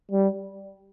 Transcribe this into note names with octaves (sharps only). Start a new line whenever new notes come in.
G3